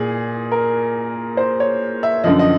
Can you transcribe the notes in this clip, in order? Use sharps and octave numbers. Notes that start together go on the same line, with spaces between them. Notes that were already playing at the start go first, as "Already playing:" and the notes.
Already playing: A#2 G#4
A#4
C5
C#5
E5
F#2 D3 F3 D#5
D#5